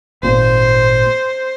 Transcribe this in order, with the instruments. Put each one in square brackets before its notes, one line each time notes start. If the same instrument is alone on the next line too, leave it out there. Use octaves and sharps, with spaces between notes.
[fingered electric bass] G#1 A#2 [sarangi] C5